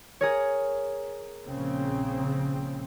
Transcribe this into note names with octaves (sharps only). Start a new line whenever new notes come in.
G#4 A#4 C#5
A#1 C#3 C4